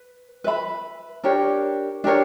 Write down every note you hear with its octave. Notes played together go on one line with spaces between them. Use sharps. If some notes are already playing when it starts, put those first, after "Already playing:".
Already playing: B4
B4 E5 B5
D4 G4 A#4 C#5
D4 G4 A#4 C#5